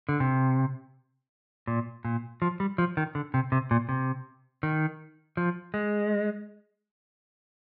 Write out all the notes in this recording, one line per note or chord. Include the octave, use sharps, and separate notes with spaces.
D3
C3
A#2
A#2
F3
G3
F3
D#3
D3
C3
C3
A#2
C3
D#3
F3
G#3